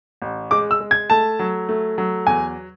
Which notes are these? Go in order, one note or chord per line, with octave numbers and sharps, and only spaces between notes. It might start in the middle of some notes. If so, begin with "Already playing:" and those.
A1
G#3 D6
E6
G#3
G#6
A3 A5
F#3
A3
F#3
E2 G#5